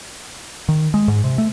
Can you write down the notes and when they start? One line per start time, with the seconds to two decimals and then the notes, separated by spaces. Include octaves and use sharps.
0.69 D#3
0.94 G#3
1.08 G#2
1.24 C3
1.38 A3